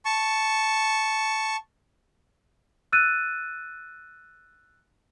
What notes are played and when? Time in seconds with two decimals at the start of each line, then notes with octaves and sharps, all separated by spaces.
0.05 A5 C#6
2.92 E6 F#6 A6 D#7